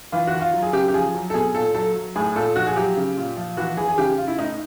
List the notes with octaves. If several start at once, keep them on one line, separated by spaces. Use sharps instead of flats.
E3 F4
F#4
D#3
F4
F#3
G#4
C#3 G4
G4
F3 G#4
F#3
A4
B2 G#4
A#2 A4
F#3 A4
F#3
A2 G#4
A#2 A4
F3 F#4
G#4
F#3 G4
C#3
A#2
F3
E3 F#4
E3 G#4
G#4
C#3 G4
C#3 F4
E4
A2 D#4